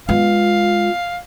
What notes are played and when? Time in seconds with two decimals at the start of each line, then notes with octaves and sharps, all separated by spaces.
0.09 G#3 B3 F4 F5